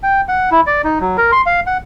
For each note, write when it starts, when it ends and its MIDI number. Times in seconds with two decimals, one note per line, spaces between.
0.03 0.21 79
0.29 0.50 78
0.51 0.61 64
0.67 0.82 74
0.84 0.99 63
1.00 1.17 54
1.18 1.31 70
1.32 1.42 84
1.46 1.60 77
1.67 1.78 78